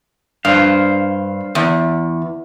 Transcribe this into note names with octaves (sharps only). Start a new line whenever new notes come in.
G2 C5 F5
E2